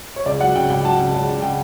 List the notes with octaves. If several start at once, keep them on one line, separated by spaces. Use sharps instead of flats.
C#5
C#2 D5
F#3 F#5
C#3 G5
C#2 G5
F#3 A5
C#3
C#2
C#3
C#3 G5